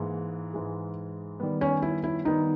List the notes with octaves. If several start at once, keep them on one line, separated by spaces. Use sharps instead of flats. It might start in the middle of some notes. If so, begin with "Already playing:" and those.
Already playing: G#2 E3 G#3 A#3
G#2 E3 G#3
D#3 G3 B3
C#4
E4
E4
D#3 G3 B3 D#4